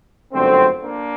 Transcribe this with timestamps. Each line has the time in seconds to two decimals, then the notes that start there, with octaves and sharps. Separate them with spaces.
0.32 G1 F#2 D3 A3 C4
0.83 A#3 D4